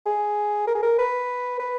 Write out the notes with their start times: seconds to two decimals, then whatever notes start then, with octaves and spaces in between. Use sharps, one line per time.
0.06 G#4
0.67 A#4
0.75 G#4
0.83 A#4
0.99 B4
1.60 B4